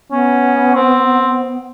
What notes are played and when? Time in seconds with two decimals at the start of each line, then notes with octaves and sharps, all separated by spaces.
0.11 B3 C#4
0.75 C4